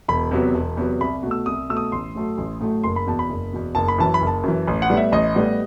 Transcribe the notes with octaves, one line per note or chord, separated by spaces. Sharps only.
E1 B5
E2 C3 F#3 B3
E1
E2 C3 F#3 B3
C2 B5
B2 A3
E6
C2 D#6
B2 A3 E6
D#6
A1 C6
A2 F#3 A3
A1
A2 F#3 A3
F#1 C6
B5
E2 B2 A5
B5
F#1
E2 B2
F#1 A5
B5
F#2 E3 A5
B5
F#1
A5
F#2 E3
A1
F#5
A2 G3 B3
E5
A1 D#5
A2 G3 B3